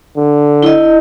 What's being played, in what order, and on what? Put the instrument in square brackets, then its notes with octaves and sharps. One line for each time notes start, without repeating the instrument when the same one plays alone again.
[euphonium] D3
[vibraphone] E4 D#5